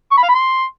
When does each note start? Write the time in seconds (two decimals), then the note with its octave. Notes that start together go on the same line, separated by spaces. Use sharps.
0.11 C#6
0.17 B5
0.23 F5
0.29 B5
0.35 C6